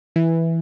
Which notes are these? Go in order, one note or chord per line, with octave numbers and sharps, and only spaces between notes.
E3